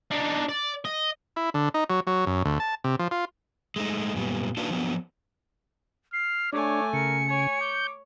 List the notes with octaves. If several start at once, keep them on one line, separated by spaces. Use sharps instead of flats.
D4 D#4
D5
D#5
E4
D3
D#4
F#3
F#3
F#2
D2
A5
C3
F3
F4
G#3 A3 D#4
F#2 A#2 G3 B3
A#3 D4 D#4 F4 F#4 B4
F3 F#3 B3 D4
F6 C7
A3 D4 C#5 G#5 D6
C#3 A#4 C#7
C#5 G#5
D6 G6